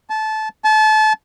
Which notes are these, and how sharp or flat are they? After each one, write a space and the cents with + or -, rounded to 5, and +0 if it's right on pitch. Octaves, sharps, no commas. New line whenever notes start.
A5 -20
A5 -30